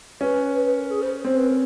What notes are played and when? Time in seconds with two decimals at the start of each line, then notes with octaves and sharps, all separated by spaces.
0.21 C#4 B4
0.55 B4
0.66 B4
0.77 A#4
0.90 G#4
1.01 C5
1.24 C4 C5
1.36 B4
1.47 A#4